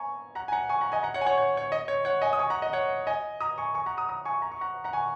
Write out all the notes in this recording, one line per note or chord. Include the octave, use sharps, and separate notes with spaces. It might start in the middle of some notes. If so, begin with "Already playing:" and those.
Already playing: G#5 A#5 C#6
F#5 A#5
G#5
F#5 A#5
G#5 C#6
F#5 A#5
D#5 G#5
F#5 A#5
C#5 F#5
G#5
C#5 F#5
C#5
C#5
D#5
C#5
C#5 F#5
D#5 G#5
D#6
G#5 C#6
F#5 A#5
D#5
C#5 F#5
D#5 G#5
A#5 D#6
G#5 C#6
G#5 C#6
F#5 A#5
A#5 D#6
A#5 D#6
G#5 C#6
A#5
C#6
F#5 A#5
F#5 A#5
G#5 C#6